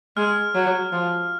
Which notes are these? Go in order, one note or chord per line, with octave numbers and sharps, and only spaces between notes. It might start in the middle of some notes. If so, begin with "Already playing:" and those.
G#3 F6
F#3
F3